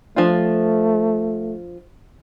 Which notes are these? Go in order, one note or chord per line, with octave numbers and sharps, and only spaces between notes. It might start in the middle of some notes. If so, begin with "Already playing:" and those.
F3 A3 D4 F4